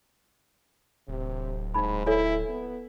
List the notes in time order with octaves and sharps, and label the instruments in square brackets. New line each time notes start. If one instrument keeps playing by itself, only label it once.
[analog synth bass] D1 [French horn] C3
[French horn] G#2 [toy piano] D#4 B5
[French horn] E4 [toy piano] A4 C#5 G#5
[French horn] B3